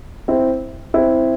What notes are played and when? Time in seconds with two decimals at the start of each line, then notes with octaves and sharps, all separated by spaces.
0.28 C4 E4
0.94 C4 E4